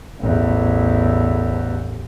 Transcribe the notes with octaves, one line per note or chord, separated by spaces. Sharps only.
A1 E2